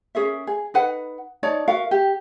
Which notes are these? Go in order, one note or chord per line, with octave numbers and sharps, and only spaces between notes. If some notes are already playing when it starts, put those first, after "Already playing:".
C#4 G#4 A#4 E5
G#4
D#4 B4 F#5
D#4 C#5 D5 A5
F#4 A#4 E5 F5
G4